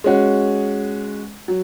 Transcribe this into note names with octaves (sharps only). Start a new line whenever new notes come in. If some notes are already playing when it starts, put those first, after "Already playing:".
G#3 C#4 F#4
F#3